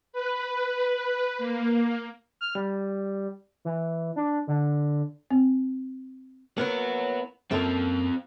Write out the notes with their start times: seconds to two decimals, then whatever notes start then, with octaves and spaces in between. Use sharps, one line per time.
0.13 B4
1.38 A#3
2.41 F6
2.55 G3
3.65 E3
4.16 D4
4.47 D3
5.30 C4
6.58 A#3 B3 E4 C#5 F#5
7.51 F#2 A#3 C4 F4 A4